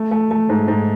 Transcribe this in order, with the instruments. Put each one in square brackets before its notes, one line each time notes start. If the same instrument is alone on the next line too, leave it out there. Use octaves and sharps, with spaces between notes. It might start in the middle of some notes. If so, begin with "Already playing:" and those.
Already playing: [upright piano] A3
A3
A3
G#2
G#2